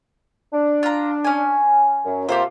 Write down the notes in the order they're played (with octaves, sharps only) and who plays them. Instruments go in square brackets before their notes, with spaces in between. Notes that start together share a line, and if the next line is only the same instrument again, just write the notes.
[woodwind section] D4
[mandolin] F4 A#5
C#4 G#5
[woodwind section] F#2
[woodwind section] C3 A#3 F4 [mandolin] G4 A4 C5